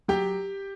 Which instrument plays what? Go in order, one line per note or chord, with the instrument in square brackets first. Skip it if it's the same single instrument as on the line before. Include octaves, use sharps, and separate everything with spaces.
[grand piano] F#3 G4 G5